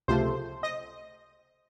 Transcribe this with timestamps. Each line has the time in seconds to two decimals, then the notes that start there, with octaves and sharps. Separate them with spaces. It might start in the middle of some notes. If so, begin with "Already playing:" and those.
0.08 C#2 C3 F3 A3 C5
0.63 D#5